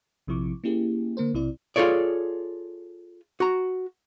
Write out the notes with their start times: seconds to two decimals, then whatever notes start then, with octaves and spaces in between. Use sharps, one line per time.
0.27 A#1 C3 F3 E4 C#6 D6
0.64 A#3 C#4 E4 G4 G#4
1.17 D3 A#3 A#4 C5
1.34 B1 C3 E4 D5
1.76 F4 G#4 A4 C#5 D5
3.40 F#4 A#5